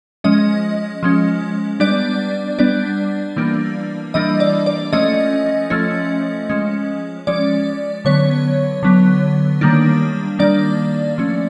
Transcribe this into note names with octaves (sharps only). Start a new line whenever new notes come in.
F3 G#3 C#4 D#5
F3 G#3 C#4
G3 B3 D4 D5
G3 B3 D4 D5
E3 G3 A#3 D4
E3 G3 A#3 D4 D#5
D5
D5
F3 A3 C#4 D#5
F3 A3 C#4
F3 G#3 C#4
F3 G#3 C#4 D5
D3 F#3 B3 C#5
D3 F#3 B3
D#3 G3 A#3 D4
D#3 G3 A#3 D4 D5
F3 A3 C#4